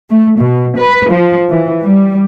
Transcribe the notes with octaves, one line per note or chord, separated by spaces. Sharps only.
A3
B2
B4
F3
E3
G3